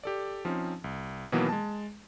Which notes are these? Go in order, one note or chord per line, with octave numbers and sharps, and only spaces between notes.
G4 A4 D5
F3 C4 C#4 D#4
C2
B2 D#3 E3 F#3 A#3 B3
G#3 A5